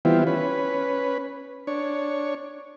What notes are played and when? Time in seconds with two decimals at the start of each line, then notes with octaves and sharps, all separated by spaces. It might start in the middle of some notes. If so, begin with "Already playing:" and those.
0.05 E3 G3 B3 C4 E4 F4
0.27 C#4 B4
1.67 D4 C#5